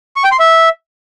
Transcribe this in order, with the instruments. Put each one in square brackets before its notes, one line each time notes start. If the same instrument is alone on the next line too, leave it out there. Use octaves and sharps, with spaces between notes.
[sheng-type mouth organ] C#6
G5
C6
E5